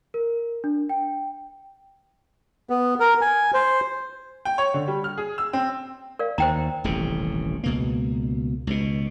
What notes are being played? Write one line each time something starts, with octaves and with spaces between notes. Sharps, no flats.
A#4
D4
G5
B3
A#4
G#5
C5
G5
C#5
D3
G3
F6
G#4
E6
C4
A#4 D5 F5
D#2 C5 G5 A#5
D#1 A1 C3
C#2 B2 A#3
C#2 B2